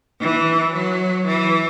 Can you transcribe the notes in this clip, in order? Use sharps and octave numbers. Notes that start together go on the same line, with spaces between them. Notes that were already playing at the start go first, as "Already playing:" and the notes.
E3
F#3
E3